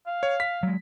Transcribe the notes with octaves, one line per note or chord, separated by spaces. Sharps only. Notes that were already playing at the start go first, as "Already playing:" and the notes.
F5
C#5
B6
F#3 G#3